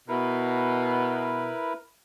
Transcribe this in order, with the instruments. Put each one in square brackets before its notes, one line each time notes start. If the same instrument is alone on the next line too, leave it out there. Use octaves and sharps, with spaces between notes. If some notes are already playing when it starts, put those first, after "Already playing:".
[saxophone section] B2 [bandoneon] E4 A#4 B4